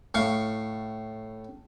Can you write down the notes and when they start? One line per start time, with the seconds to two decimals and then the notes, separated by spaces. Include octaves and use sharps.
0.14 A2 F5 C#6